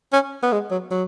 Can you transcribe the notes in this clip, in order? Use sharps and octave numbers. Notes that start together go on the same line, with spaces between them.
C#4
B3
G#3
F#3
F#3